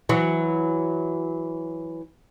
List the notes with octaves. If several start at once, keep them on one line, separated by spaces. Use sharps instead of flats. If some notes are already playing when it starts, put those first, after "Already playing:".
E3 F#3